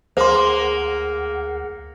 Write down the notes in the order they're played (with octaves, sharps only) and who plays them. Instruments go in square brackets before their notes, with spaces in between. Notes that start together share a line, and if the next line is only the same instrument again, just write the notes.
[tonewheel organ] D2 F#5 [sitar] A#3 [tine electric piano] G#4 [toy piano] C5 C6